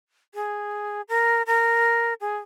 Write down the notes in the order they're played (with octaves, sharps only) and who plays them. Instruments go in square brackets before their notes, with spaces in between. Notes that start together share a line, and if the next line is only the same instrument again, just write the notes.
[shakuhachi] G#4
A#4
A#4
G#4